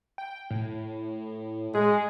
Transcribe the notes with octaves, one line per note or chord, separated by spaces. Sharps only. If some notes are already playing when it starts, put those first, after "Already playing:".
G5
A2
G#3 G#4